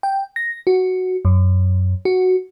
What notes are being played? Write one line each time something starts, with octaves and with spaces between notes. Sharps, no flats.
G5
A#6
F#4
F#2
F#4